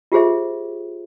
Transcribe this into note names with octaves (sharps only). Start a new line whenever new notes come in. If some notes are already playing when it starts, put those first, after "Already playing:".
F4 G4 G#4 C5 E5